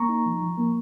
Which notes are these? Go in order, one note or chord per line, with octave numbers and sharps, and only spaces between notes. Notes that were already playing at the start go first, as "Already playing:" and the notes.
Already playing: A#3 A#5 C#6
D#4
F3
F3
A#3